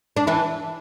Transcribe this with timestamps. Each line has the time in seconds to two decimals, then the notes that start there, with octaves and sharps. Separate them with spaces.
0.17 D4
0.27 E3 E4